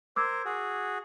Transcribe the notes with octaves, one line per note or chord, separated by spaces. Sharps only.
A#4 C5 D6 E6 G#6
F#4 G#4